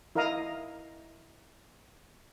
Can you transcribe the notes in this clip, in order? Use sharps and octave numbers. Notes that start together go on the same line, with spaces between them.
E4 A#4 D#5 F5 A#5 D#6